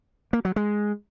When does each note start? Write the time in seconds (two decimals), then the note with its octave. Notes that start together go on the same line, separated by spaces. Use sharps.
0.33 A#3
0.45 F#3
0.56 G#3